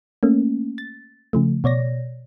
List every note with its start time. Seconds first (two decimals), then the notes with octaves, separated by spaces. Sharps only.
0.23 A3 A#3 C#4
0.78 A6
1.33 C#3 F3 A3
1.64 B2 C#5 D5 A#6